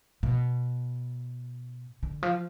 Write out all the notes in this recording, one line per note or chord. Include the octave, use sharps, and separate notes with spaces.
B2
D3
F3